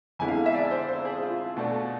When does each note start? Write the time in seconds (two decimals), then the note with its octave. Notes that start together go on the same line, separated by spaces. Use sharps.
0.19 F2 D3 G#3 B3 E4 G#5
0.28 F5
0.46 E5
0.54 D5
0.71 C5
0.88 C5
1.05 G#4
1.22 F4
1.57 B2 A3 D4